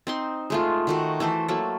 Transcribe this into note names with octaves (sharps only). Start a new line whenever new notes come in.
C4 D#4 C6
G#3 A3 F4
D#3 A3 F#4
E3 A3 A4 C5
F#3 A3 A#3 A4